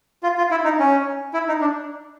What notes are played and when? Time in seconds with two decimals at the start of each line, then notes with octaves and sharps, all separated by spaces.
0.23 F4
0.38 F4
0.51 E4
0.64 D#4
0.79 C#4
1.33 E4
1.48 D#4
1.61 D4